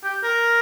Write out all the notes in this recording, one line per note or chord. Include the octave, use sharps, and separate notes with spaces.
G4
A#4